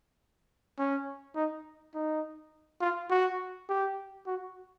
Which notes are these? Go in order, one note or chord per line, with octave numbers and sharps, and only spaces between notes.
C#4
D#4
D#4
F4
F#4
G4
F#4